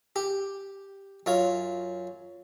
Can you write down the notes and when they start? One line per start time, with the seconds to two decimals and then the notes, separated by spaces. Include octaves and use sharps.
0.16 G4
1.26 F#2 F4 C#5